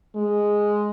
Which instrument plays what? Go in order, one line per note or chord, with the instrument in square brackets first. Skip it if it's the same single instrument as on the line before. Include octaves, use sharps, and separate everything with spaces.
[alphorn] G#3